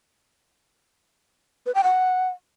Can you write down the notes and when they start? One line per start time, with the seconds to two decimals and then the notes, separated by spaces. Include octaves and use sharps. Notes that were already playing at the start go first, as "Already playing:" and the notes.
1.66 B4
1.75 G5
1.84 F#5